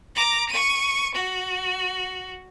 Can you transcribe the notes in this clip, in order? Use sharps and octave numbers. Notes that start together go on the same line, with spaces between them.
A#5 D6
C#6 D#7
F#4